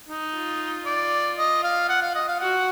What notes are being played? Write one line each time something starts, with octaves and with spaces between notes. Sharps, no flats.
D#4
F4
D5
D#5
F5
F#5
F5
D#5
F5
F#4 F#5